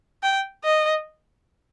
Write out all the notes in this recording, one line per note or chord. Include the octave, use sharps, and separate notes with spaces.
G5
D#5